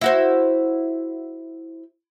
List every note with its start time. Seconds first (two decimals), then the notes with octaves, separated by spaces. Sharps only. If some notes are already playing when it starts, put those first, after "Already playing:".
0.01 E4 F#4 C5